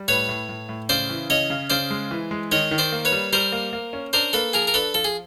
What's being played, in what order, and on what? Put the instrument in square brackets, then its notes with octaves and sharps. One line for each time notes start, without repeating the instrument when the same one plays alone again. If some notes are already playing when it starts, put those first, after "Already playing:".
Already playing: [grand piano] G3
[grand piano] A2 [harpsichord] B4 C#5
[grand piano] A2
A2
A2
[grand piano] C#3 [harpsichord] C5 D5
[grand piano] E3
[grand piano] C#3 [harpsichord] C#5 D#5
[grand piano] C#3
[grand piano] C#3 [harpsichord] C5 D5
[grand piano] G#3
E3
G#3
[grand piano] D#3 [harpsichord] C#5 D#5
[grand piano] D#3
[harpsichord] C5 D5
[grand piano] A#3
[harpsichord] B4 C#5
[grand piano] G3
[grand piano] G3 [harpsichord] A#4 C5
[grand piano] A#3
A#3
C#4
[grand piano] D4 [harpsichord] A#4 C5
[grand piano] A#3 [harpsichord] A4 B4
[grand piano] F3 [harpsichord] G#4 A#4
[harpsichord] A#4
[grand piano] D4 [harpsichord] A4 B4
[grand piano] F3 [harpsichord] A4
[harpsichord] G#4